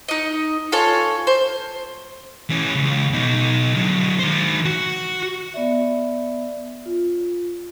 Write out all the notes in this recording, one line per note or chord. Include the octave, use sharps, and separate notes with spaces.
D#4 D#5
F4 A4 C#5 G#5
C5
E3 C#4
C#2
B2 D#4
D3 F#3
D#3 C5
F#4
B3 D5 E5
F4